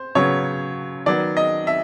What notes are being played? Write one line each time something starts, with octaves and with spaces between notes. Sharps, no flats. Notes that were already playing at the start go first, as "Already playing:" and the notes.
Already playing: C5
C#3 F#3 B3 C#5
D#3 F#3 B3 D5
D#5
E5